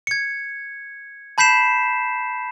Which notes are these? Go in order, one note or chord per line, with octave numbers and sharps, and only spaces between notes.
G#6 C#7
A5 B5 G6 B6 C7 E7